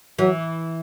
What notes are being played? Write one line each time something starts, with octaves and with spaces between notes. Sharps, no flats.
E3 F#3